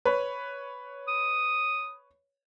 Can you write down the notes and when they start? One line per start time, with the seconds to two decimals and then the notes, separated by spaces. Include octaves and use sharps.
0.05 B4 C#5
1.08 D#6